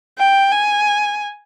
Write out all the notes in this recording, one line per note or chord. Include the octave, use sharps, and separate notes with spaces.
G5
G#5